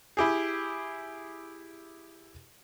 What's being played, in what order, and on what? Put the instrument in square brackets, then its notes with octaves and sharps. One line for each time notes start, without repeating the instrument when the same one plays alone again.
[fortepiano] E4 G4 G#4